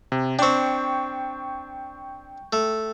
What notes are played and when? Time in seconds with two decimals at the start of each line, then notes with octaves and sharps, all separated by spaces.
0.12 C3
0.39 C4 D4 G5 C#6
2.53 A3